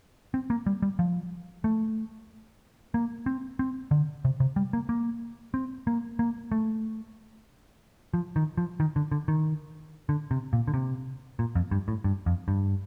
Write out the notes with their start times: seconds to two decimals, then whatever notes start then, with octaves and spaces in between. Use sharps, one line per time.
0.34 C4
0.50 A#3
0.66 G3
0.82 G3
0.99 F3
1.64 A3
2.94 A#3
3.26 C4
3.59 C4
3.91 D3
4.25 C3
4.40 C3
4.56 G3
4.73 A#3
4.89 A#3
5.54 C4
5.87 A#3
6.19 A#3
6.52 A3
8.14 F3
8.36 D#3
8.57 F3
8.80 D#3
8.96 D3
9.12 D3
9.28 D#3
10.09 D3
10.31 C3
10.53 A#2
10.67 D3
10.74 C3
11.39 A#2
11.55 F2
11.71 G2
11.88 A2
12.04 G2
12.26 F2
12.48 G2